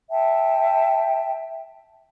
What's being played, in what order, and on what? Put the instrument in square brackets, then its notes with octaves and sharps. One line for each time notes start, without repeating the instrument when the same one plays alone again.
[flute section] E5 G5 A5